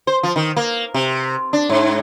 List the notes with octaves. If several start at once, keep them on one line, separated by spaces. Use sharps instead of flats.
C5
F3
D#3
A#3
C3
D4
G#2